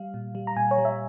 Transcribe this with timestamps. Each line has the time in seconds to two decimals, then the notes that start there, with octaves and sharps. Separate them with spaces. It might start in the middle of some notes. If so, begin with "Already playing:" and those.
Already playing: G3 F5
0.14 A#2
0.35 G3
0.47 A#5
0.56 A#2 G#5
0.71 C#5
0.78 G3
0.85 E5